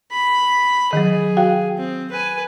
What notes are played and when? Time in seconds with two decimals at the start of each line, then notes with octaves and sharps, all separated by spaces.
0.12 B5
0.93 D#3 F#3 G#4
1.37 F#4 F5 G5
1.78 C4
2.11 B4 G#5